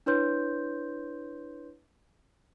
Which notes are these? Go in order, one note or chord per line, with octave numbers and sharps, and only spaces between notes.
D4 E4 B4 C#5 C6 G6